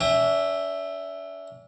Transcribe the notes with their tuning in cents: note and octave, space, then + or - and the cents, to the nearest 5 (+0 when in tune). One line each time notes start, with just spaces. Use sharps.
D4 -45 E5 +0 G5 +40